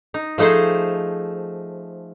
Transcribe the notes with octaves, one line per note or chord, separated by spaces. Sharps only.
D#4
F3 A3 D#4 G#4 C5